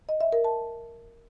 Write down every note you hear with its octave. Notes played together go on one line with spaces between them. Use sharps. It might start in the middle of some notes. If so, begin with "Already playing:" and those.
D#5
E5
A#4
A5